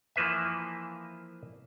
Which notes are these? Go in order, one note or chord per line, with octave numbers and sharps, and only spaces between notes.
E3 F3 A#3 B4 E5